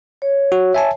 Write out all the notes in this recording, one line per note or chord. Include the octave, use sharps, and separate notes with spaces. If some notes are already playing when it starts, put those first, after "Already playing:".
C#5
F#4
E5 G#5 A5